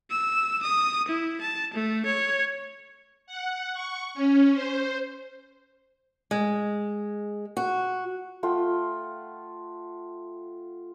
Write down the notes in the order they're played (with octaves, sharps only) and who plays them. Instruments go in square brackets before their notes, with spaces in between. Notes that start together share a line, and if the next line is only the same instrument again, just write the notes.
[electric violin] E6
D#6
E4
A5
A3
C#5
[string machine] F#5
C#6
C#4
C5
[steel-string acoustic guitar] G#3
F#4
[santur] A3 F4 F#5 G5